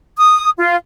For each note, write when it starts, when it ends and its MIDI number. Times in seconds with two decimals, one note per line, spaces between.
0.18 0.50 87
0.58 0.76 65